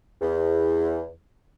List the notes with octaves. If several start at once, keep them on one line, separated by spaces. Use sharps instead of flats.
E2